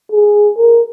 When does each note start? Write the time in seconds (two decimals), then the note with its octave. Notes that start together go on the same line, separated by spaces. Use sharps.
0.12 G#4
0.58 A#4